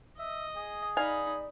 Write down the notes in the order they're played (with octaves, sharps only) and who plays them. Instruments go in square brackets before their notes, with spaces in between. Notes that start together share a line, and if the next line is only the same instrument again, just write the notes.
[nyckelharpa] D#5 [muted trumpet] E5
[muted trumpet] G#4
[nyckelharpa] D#4 B5 [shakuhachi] D5 [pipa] F5 G#5